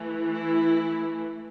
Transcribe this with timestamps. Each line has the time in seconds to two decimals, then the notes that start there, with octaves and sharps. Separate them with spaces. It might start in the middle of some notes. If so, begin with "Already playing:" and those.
Already playing: E3 A3
0.32 E4